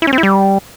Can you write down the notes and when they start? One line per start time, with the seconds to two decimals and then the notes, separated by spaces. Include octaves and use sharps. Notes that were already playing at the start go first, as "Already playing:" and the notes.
0.02 E4
0.07 C#4
0.13 C4
0.18 E4
0.23 G3